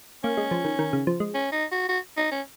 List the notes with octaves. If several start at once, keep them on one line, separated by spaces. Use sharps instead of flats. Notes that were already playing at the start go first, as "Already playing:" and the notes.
A#3 C#4
G#3
F3
D#3
D#3
C#3
F3
G#3
C#4
D#4
F#4
F#4
D#4
C#4